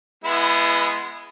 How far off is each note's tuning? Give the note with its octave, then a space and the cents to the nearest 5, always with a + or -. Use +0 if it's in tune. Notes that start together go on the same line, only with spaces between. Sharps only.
G#3 +0 B3 +0 E4 +25